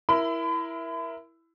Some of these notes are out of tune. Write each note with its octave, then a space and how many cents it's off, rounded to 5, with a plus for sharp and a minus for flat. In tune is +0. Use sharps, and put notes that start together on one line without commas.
E4 +5 A#4 +15 B5 +40